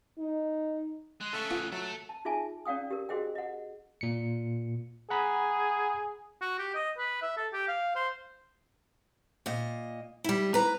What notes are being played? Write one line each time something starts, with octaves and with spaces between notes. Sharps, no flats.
D#4
G#3 F#6
C#3 A3 A4 E5 C#6
B3 F4
F#3 A4 E5
A5
D#4 F4 G#4 E5 G#5 A5
C#4 D5 F5 G5 D#6
G4 A#4
F#4 G#4 C5 D#5 G5
D#5 F#5
A#2 C#7
G#4 F#5 A#5 B5
F#4
G4
D#5
B4
E5
A4
G4
F5
C5
A#2 D#5
G3 E4
B4 A#5